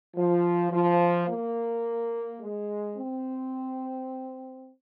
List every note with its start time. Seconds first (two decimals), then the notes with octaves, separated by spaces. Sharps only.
0.15 F3
0.71 F3
1.27 A#3
2.40 G#3
2.96 C4